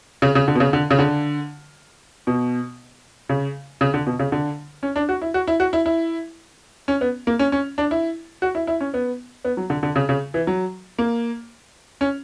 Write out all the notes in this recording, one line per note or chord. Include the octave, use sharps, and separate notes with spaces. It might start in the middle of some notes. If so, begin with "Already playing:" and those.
C#3
C#3
D3
B2
C#3
D3
C#3
D3
B2
C#3
C#3
D3
B2
C#3
D3
C#4
D4
F#4
E4
F#4
E4
F#4
E4
E4
C#4
B3
A#3
C#4
C#4
D4
E4
F#4
E4
E4
C#4
B3
B3
F#3
D3
D3
C#3
C#3
E3
F#3
A#3
C#4